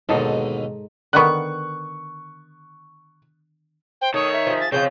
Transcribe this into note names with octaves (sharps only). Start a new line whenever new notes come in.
D#2 G#2 B2 D3 D#4 A4
D3 D#3 B3 C#6 F#6
C5 G5
D#3 A3 C#5 D#6
E5
F3 G#4
A6
C#3 E3 F3 C4 F4 G#4 G6